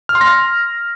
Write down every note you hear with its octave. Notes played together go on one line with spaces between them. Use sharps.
F6
C6
A#6